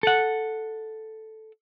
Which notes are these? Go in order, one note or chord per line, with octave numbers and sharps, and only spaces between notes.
A4 F#5